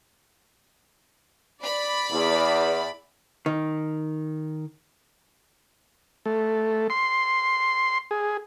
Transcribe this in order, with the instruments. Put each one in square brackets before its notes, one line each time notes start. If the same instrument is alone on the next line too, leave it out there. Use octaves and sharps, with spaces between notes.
[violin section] D5 B5
[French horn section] E2
[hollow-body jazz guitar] D#3
[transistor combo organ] A3
C6
G#4